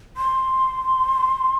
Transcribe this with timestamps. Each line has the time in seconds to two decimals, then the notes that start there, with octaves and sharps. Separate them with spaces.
0.17 C6